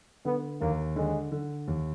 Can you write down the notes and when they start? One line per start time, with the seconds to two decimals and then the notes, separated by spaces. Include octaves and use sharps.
0.25 D3 B3
0.61 D#2 A#3
0.96 D3 G#3
1.32 D3
1.68 D#2